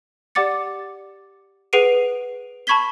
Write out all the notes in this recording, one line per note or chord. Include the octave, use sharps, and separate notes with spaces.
G4 D5 F#5 D6 A6 C#7
G#4 B4 F#5 C7 D7 D#7
A5 B5 C#6 G#6 B6 G7